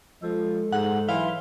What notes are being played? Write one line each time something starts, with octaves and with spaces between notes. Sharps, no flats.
F3 G#3 A4
G#2 F#5
E3 F#3 E5 F5 C6